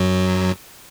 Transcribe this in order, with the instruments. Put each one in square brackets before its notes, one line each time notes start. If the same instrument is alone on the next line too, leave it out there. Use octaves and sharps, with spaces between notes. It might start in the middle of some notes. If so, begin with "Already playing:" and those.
Already playing: [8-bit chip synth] F#2 F#3